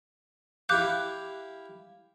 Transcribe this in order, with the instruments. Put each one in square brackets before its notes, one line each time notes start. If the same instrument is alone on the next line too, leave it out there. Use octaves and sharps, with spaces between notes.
[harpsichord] E4 G4 F5 [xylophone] D6 F#6 G6